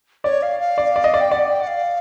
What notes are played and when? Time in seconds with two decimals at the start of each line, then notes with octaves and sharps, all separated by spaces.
0.24 C#5 D5
0.42 F5
0.60 F5
0.78 D5
0.96 D5
1.04 D#5
1.14 D5
1.20 G5
1.31 D5 F#5
1.49 G5
1.62 F#5
1.67 F5